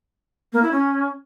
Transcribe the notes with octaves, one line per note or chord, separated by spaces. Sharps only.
A#3
E4
C#4